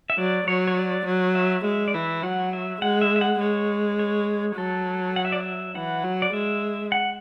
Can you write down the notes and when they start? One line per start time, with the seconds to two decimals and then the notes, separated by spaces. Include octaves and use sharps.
0.10 E5
0.18 F#3 D5
0.47 F#3 C#5
0.67 C#5
0.77 D5
1.06 F#3
1.35 E5
1.64 G#3 E5
1.88 D5
1.94 E3 E5
2.23 F#3 F#5
2.53 E5
2.81 G#3 F#5
3.02 E5
3.16 E5
3.21 F#5
3.40 G#3 C#5
3.99 C#5
4.57 F#3 A4
5.16 F#5
5.25 E5
5.32 D5
5.40 E5
5.75 E3 F#5
6.04 F#3
6.22 D5
6.33 G#3 E5
6.92 F#5